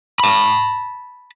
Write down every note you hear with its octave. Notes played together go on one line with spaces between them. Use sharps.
A5 B5